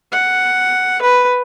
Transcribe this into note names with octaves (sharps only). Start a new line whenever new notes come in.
F#5
B4